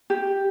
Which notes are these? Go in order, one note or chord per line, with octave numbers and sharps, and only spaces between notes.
G4